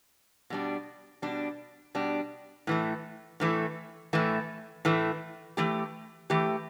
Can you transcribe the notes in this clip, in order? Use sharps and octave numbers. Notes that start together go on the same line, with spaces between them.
B2 G3 D4
B2 G3 D4
B2 G3 D4
A2 E3 A3
A2 E3 A3
A2 E3 A3
A2 E3 A3
E3 A3 G4
E3 A3 G4